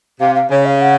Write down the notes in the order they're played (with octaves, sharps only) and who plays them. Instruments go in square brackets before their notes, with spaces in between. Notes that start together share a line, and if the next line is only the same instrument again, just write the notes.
[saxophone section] C3 [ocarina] F5
[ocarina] F5
[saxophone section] C#3 [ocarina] C#5
[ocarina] F5
F#5